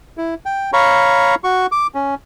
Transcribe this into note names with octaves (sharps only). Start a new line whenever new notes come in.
E4
G5
C#5 F5 A#5 B5 C#6
F#4 C#6
D6
C#4